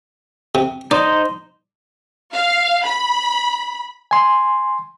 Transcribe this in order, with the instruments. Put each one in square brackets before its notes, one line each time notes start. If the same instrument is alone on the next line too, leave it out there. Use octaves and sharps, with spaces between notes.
[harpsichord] C3
[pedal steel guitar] D#4 C5 D#5 [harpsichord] D5
[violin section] F5
B5
[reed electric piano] G#5 C6